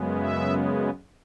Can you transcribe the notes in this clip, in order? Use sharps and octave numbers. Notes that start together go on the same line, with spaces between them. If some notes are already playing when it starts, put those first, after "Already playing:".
Already playing: F#2 C#3 G#3 B3
E5